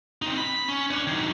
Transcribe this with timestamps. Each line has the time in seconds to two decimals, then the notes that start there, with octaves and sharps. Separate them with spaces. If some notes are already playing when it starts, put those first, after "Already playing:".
0.22 C4 D#4
0.38 B5
0.68 C#4
0.91 D4 C#5
1.07 D#3 F#3